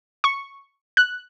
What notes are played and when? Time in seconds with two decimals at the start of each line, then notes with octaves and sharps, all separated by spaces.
0.24 C#6
0.97 F#6